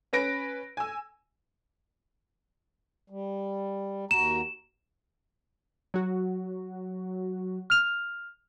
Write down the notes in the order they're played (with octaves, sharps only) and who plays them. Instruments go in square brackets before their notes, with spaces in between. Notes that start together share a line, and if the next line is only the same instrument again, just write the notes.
[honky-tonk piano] C#4 B4 A#6 D7
G#5 E6
[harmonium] G3
[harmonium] D#2 F#4 A#5 [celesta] E7
[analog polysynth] F#3 F#4
[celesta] F6 F7